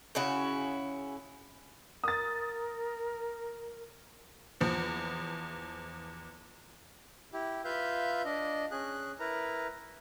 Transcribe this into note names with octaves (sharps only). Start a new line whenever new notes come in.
C#3 C#4 E4 F#4
A#4 D#6 A6
E2 F3
E4 G4
F4 B4 E5 F5 G6
D4 D#5
C#4 G#4 F#6
E4 A#4 B4 A#5